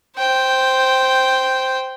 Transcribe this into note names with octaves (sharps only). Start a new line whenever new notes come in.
C5 G5